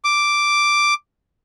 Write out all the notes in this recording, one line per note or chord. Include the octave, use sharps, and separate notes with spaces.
D6